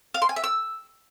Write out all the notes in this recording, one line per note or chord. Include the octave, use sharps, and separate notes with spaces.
F5
C6
G#5
E5
E6